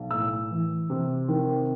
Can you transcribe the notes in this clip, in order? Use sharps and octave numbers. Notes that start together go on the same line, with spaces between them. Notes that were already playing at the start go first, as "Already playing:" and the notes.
Already playing: B1
A2 E6
E3
C3
D#3